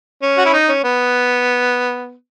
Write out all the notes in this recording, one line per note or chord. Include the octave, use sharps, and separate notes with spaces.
C#4
F#4
E4
D#4
C#4
B3